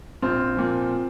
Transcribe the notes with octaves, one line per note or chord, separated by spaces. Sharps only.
A#1 C4 F4
A#2 F3